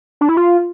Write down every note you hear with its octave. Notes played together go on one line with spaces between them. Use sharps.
D4
E4
F4